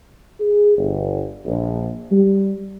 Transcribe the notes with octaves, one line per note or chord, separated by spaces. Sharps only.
G#4
G1
A#1
G3